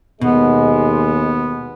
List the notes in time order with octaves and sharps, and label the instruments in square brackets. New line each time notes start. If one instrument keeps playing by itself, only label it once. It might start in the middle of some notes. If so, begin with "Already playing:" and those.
[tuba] D#2 [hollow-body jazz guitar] B2 [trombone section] G#3 [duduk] B3